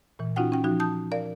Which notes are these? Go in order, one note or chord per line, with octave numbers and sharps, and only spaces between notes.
A#2 E3
C#4 D#4 F4 F#4 F#5 G5
C#4 G5
F3 D#4 F#4
A5 D#6 G6
A#4 D5 F5